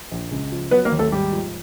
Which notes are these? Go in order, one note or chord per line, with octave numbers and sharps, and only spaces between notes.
A#1
C#2
F3
F#3 B3 B4
A#3 A#4
D#2
A3 A4
G#2 G3 G4
F3